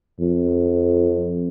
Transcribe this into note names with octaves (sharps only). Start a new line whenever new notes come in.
F2